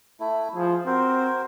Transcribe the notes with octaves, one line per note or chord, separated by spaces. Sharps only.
A3 E4
F3 G#4
C4 F#4 A#4 C5